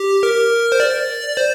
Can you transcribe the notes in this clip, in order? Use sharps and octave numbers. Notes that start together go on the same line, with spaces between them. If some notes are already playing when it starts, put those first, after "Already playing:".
Already playing: G4
A#4
C5
D5
C5